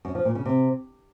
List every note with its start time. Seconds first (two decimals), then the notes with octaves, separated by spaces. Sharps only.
0.05 F#2
0.15 F3
0.25 A#2
0.35 C#3
0.46 C3